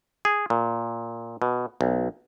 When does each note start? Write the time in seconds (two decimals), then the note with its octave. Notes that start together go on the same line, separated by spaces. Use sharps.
0.25 G#4
0.50 A#2
1.42 B2
1.81 B1